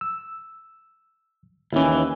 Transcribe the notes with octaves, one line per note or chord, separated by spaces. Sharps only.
E6
D#2 E3 C#4 E4